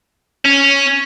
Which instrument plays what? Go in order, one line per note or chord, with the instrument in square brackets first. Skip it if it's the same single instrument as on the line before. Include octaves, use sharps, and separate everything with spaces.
[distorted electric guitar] C#4